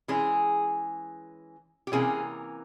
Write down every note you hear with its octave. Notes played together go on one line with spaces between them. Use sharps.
E3 G#3 C#4 G#4
G4
C3 E3 A#3 C#4 G#4